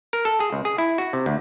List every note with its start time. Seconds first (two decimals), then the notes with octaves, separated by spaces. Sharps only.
0.13 A#4
0.25 A4
0.40 G#4
0.52 C#2
0.65 G#4
0.78 E4
0.98 F#4
1.13 C3
1.26 D2